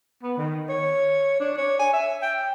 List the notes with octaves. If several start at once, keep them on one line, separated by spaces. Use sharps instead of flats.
B3
D#3
C#5
D4
C#5
G#5
E5
G5